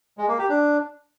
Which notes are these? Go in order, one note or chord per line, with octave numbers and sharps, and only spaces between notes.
G#3
A#3
G4
D4